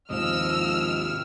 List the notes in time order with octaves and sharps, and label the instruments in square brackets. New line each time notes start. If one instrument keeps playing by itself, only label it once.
[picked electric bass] D#2 G#2 C3 [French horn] F3 [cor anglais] D#5 [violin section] E6 F6